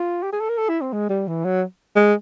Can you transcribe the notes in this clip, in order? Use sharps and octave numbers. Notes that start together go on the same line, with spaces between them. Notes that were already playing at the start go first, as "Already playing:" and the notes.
Already playing: F4
G4
G#4
A4
A#4
A4
E4
C4
G#3
G3
E3
F#3
G#3